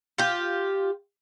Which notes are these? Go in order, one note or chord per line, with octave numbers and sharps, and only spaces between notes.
F4 G4